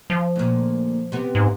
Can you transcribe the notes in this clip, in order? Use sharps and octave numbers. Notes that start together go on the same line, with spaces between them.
F3
D2 A#2
C3 B3
G#2